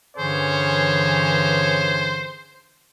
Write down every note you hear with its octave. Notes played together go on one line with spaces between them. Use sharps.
G2 D3 E3 C#4 G#4 C5 C#5